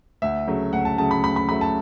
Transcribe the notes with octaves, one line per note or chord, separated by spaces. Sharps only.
D2 E5
C#3 F#3 A3
D2 F#5
A5
C#3 F#3 A3 A5
B5
D2 B5
B5
C#3 F#3 A3 B5
A5